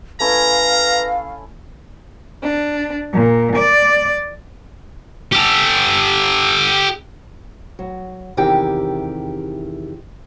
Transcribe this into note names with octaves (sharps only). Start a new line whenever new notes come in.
A3 C#4 E4 B4 F5 A#5
D4
A#2
D5
G4 A4
F#3
E2 C3 D#3 E4 G4 G5